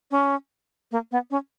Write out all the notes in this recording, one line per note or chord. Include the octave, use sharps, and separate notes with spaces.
C#4
A#3
B3
C#4